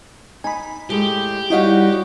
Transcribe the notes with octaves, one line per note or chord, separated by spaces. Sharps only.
D#4 G#5 B5
A2 G#3 G4
G3 D#4 E4 F#4 C#5 D#5 F5 F#5